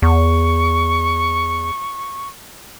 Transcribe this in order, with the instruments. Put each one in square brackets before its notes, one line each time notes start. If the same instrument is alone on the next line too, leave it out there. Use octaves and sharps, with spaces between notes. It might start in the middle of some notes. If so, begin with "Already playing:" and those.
[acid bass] E2 [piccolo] C#6